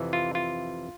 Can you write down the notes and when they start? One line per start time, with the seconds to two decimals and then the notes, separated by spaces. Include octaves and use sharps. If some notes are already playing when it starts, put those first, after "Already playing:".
Already playing: F2 C3 E3
0.13 F4
0.35 F4